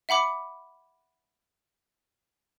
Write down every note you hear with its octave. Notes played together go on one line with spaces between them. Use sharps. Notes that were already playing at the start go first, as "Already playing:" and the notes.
E5 F#5 B5 D6